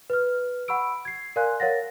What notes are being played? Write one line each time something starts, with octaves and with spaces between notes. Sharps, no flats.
B4 F6
F#5 B5 C#6 E6 D7
G#6 C7
A#4 D5 F5 G#5 C6 F#6
A#4 C#5 F5 F#5 A6 A#6